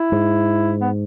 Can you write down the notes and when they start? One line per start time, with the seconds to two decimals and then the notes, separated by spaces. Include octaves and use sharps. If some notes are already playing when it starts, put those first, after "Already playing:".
Already playing: E4
0.12 G#2
0.81 B3